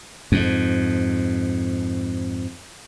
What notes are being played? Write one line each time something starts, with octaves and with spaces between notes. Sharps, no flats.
F2 G#2